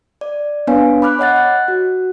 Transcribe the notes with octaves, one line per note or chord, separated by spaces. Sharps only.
D5
B3 D4 B4 C#5 F5 G#5
B5 D6 F6 F#6
C#5 D#5 F#5 F#6 A6
F#6
F#4